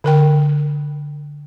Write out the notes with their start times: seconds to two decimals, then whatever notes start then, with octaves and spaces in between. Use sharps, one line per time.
0.04 D3 A#4 G5